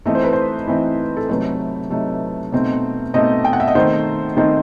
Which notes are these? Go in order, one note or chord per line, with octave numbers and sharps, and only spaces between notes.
E3 A3 C4 D#4 D#5
C5
B4
C5
E3 A3 C4 D#4
A4
C3 F#3 A3 D#4 B4
C3 F#3 A3 D#4
B2 A3 C4 D#4
B2 A3 C4 D#4 D#5
G5
F#5
E5
D#5
D#3 A3 C4 D#4 C5
D#3 A3 C4 D#4